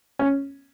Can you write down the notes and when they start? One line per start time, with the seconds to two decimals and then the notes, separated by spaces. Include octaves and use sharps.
0.19 C#4